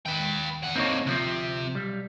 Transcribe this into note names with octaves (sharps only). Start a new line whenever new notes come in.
D#2 B4 G5
E2 F#5
D3 A#3 C4 D#4 C#5
D2 C3 F3 C4
B1 G3